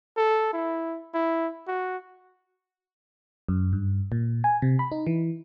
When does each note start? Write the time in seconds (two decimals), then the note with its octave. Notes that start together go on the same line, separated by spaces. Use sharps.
0.17 A4
0.53 E4
1.14 E4
1.68 F#4
3.49 F#2
3.73 G2
4.12 A#2
4.44 G#5
4.62 C3
4.79 B5
4.92 D#4
5.07 E3